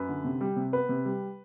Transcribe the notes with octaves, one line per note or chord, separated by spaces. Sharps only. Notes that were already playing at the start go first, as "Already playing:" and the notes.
Already playing: F#2 B4
D3
C3
G3
C3
B3 B4
C3
G3